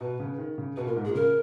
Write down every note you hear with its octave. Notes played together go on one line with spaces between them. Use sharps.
B2 B4
C#3
D#3
C#3
B2 B4
A#2 A#4
G#2
A#2 G#4
C#3 A#4